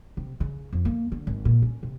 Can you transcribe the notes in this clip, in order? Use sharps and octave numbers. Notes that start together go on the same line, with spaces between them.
C3
C#3
F2
A#3
D3
G#1
A#2
C#4
C3